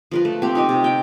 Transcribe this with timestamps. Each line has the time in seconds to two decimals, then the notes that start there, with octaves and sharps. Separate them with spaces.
0.11 F3 A#4 B4
0.25 A3
0.42 C4 G4
0.55 D#4 G4 D#5
0.69 C3
0.84 G5